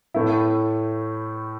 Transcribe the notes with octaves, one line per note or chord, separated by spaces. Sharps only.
A2 A3 E4